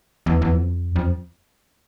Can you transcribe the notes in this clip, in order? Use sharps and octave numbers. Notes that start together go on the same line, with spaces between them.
E2
E2
F2
F2